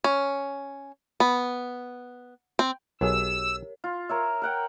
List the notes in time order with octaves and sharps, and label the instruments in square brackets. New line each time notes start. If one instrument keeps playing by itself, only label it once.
[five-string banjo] C#4
B3
C4
[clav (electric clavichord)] B1 F#3 G#4 [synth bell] G4 A#4 C#5 [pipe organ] E6
[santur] F4
A#4 C#5 E5
A#4 F#5 G5